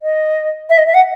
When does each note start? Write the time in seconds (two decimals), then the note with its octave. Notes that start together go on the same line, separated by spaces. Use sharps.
0.02 D#5
0.70 E5
0.78 D#5
0.87 E5
0.94 F#5